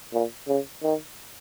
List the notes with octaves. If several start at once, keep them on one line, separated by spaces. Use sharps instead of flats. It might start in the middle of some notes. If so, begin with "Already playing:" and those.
A#2
C#3
D#3